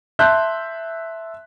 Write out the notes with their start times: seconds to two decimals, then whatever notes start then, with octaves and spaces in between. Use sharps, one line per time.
0.19 E5 A5 C6 F#6 G6